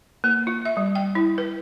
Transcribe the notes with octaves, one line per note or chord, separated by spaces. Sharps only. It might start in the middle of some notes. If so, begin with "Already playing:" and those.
A#3
F4
E5
G3
G5
E4
B4